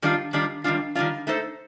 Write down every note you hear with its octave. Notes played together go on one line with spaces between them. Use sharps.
D#3 G3 D4 F4
D#3 G3 D4 F4
D#3 G3 D4 F4
D#3 G3 D4 F4
A3 D#4 A4 C5